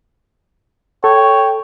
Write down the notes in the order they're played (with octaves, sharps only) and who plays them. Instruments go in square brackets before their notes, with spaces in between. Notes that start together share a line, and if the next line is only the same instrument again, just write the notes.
[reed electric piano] A4 [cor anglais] C#5 [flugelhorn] G5